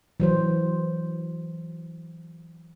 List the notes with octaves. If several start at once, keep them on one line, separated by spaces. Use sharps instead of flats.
E3 F#3 C5